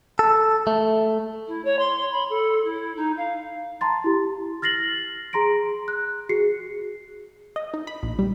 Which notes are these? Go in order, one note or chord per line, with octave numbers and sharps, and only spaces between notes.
A4
A3
E4
C#5
C6
B5
A4
E4
D#4
F5
A5 A#5 C6 A6
E4 G4
F6 A6 A#6 C7 F#7
G#4 A#5 C6 A#6 D7
F#6
F#4 G#4 C7 C#7
D#5
D#4
B5
A#1
G3